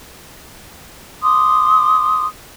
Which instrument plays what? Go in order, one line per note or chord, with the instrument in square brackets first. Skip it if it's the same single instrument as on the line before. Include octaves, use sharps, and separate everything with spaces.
[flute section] C6 D6 D#6